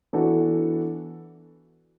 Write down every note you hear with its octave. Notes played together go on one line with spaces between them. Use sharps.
E3 B3 D4 F#4 A4